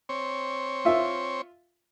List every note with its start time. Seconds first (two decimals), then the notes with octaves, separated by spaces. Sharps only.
0.09 C4 C#5
0.85 F4 E5